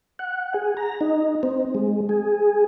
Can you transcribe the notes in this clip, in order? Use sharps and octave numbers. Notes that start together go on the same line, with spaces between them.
F#5
G#4
A#5
D#4
C4
G#3
G#4